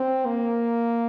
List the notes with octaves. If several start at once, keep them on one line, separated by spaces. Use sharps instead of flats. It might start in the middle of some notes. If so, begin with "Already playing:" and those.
Already playing: C4
A#3